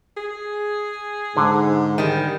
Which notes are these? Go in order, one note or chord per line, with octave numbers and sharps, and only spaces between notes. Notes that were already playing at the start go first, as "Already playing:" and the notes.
G#4
G#2 D3
D#3 G3